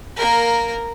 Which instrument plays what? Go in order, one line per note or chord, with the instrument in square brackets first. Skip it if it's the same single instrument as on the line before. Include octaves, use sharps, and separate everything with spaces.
[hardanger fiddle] A#3 A#4